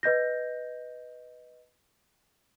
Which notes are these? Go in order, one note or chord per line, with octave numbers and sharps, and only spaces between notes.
B4 D#5 G6 A#6